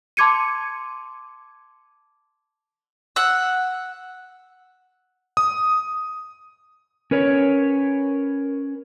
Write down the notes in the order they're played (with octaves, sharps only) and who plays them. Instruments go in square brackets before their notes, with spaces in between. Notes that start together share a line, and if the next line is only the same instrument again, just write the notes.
[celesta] A5 C6 D6 G#6 C#7 D#7
[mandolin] F#5 E6
[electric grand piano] D#6
[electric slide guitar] C#4 A#4 B4 C#5